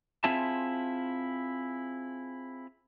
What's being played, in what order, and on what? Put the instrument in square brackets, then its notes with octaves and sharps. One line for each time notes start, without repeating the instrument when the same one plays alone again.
[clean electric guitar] C4 E4 F4 G#4 E5 A5